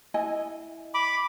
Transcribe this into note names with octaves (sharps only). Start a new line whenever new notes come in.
E4 D#5 G#5
B5 D6